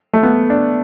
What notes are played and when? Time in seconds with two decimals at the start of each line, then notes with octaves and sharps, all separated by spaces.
0.13 A3
0.23 B3
0.50 D4